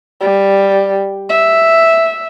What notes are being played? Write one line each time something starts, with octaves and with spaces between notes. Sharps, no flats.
G3
E5